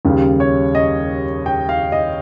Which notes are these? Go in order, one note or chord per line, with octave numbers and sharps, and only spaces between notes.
D#2 C#3 G3
C#5
D#5
G5
F5
D#5